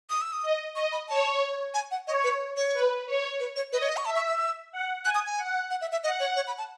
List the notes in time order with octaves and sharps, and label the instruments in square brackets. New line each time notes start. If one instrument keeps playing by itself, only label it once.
[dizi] D#6
E6
D#6
[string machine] D#5
[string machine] D#5 [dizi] C#6
[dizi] B5
[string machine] C#5 [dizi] A5
[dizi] G#5
F#5
[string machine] C#5 [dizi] D#5
[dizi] B4
C#5
[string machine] B4
C#5
[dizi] B4
C#5
[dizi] B4 [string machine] D#5
[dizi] C#5
D#5
C#6
[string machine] E5 [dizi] A5
[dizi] C#6
E6
[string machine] F#5
[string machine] G#5 [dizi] F#6
[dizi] D#6
G#5
[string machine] F#5
[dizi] F#5
E5
E5
[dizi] D#5 [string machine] F#5
[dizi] C#5
C#5
B5
A5